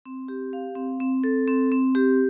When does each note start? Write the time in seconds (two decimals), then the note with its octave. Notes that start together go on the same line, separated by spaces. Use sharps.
0.06 C4
0.28 G4
0.53 F5
0.76 C4
1.00 C4
1.24 A4
1.47 C4
1.72 C4
1.95 G4